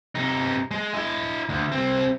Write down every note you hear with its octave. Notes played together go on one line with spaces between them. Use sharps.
C3 D#4
G#3
E4 D#5
D2
C2 C4